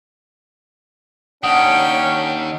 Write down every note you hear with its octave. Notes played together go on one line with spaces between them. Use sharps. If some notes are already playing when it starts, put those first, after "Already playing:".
D#2 C#4 D4 F#5 G5 D#6